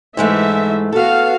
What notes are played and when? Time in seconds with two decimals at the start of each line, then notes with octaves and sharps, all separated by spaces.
0.17 G#2 E3 G#3 A3 E5
0.92 B3 F#4 A4 F5